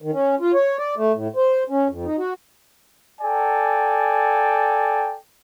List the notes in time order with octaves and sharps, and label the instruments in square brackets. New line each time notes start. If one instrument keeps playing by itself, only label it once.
[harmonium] D#3
C#4
F4
C#5
D5
A3
A2
C5
C#4
F2
D#4
F#4
[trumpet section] A4 D5 G5 G#5